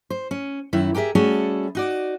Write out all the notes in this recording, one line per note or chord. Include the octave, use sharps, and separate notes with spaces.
C5
C#4
F#2 D#3 E4
G4 G#4 A#4 D#5 E5
G3 A3 C#4 F#4 G#4 A4
D#4 F#4 D5